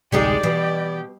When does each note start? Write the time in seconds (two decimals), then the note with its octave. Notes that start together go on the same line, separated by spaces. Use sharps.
0.12 A1 D2 C3 G3 G#3 D#4 G4 D5
0.43 B2 E3